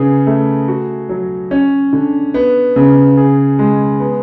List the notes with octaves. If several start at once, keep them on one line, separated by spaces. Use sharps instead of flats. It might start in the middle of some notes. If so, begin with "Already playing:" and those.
Already playing: C#3 B3 G#4
A3
F#4
F#3
C#4
D3
B3
C#3
G#4
G#3
B3